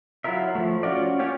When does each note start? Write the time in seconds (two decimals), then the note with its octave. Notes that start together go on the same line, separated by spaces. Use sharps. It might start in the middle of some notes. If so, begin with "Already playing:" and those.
0.24 F#3 E4 F4 A#4 E5
0.55 F3 A3
0.83 C#4 F4 F#4 D5
1.19 A#3 C#4 F4 G4 C#5